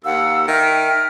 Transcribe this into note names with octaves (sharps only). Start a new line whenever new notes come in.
D#2 F5 F#5 E6
D#3 E5 G5 F6